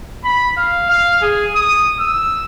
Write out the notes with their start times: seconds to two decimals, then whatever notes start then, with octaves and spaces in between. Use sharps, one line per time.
0.24 B5
0.57 F5
0.90 F5
1.22 G#4
1.55 D#6
2.00 E6